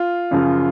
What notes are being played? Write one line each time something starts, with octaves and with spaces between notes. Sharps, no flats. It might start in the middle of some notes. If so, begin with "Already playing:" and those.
Already playing: F4
F#2 C#3 F3